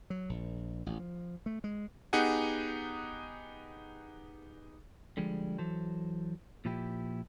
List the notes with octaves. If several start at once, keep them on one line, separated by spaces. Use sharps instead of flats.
F#3
A#1
A1
F3
A3
G#3
B3 D#4 G4 G#4 F#5 G#5
D3 F3 G3 G#3
E3 F#3 A4 C5
A#2 F3 E4 G4